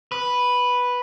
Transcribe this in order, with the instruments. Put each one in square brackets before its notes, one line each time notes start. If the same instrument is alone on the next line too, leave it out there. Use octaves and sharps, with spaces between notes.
[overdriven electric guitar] B4